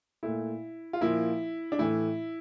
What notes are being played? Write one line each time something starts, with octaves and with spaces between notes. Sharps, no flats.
A#2 A3 E4
F4
A#2 F3 A#3 E4
D4
A2 E3 A3 E4